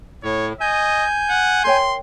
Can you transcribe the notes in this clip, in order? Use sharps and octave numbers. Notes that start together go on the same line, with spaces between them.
A2 C#5
D#5 G#5 G6
F#5
A#4 C#5 G5 C6